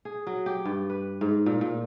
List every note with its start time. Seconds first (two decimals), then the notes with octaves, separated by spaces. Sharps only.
0.05 G#4
0.27 F#3
0.46 G4
0.65 G2
0.90 B4
1.21 G#2
1.46 A#2
1.61 A#2